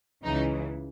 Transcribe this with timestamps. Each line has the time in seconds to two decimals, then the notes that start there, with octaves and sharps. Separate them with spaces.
0.24 C#2 C#3 E3 D#4